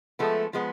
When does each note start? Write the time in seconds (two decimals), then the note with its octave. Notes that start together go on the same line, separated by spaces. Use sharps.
0.19 F3 G#3 A3 B3
0.53 F3 G#3 B3